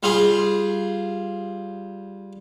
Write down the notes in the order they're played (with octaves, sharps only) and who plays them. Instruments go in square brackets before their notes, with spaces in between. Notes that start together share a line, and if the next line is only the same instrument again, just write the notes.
[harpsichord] G3 F4 G#4